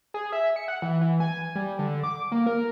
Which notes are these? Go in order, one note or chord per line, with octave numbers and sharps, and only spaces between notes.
G#4
E5
C#7
F#5
E3
E3
G#5
G3
D3
D6
A#3
A#4